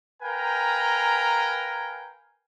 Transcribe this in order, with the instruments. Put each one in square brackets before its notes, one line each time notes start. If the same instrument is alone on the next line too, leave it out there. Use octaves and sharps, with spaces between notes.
[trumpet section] A#4 B4 F5 G5 G#5 A#5